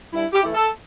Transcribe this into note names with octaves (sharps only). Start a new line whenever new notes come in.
G2 E4
G4
E3 A3 E4
A4